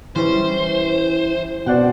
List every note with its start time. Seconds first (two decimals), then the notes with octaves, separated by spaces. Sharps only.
0.16 E3 G3 C#4 C5
1.66 B2 C5 D5 F#5 G5